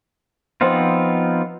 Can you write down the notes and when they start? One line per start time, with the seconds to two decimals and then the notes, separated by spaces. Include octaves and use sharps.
0.61 F3 B3 C4 D#4 F4